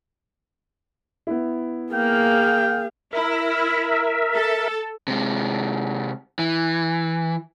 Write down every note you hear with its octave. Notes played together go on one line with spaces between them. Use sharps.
B3 E4
A#3 G#4 F5 G5
E4 A#4 E5
A4
C3 G#3
E3